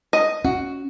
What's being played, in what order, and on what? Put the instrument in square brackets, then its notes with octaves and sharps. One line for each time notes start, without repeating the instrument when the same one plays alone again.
[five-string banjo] D#5
[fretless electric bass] C#4 [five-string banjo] F#4